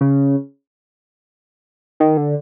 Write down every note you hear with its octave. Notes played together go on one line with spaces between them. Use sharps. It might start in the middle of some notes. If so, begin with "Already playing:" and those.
C#3
D#3
D3